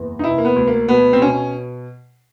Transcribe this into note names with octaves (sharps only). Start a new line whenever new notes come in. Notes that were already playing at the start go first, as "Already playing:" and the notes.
Already playing: F#1 E2
D#4
C3 E4
A#3
B3
D2
A#3
B2 B3
C4
B2 C#4